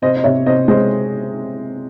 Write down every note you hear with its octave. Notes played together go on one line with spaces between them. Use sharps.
C3 C5 D#5
D#5
C3 C#5 E5
C3 C5 D#5
G#3 C5 D#5